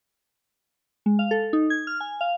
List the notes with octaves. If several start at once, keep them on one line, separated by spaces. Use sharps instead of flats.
G#3
F5
A4
D#4
G#6
F6
G#5
F5